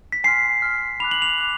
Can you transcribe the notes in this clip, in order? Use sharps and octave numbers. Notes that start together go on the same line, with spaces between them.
B6
G#5 C6 F6 C7
G#5 C6 F6
B5 D6 F#6 F7
F#7
F7
D6 F#6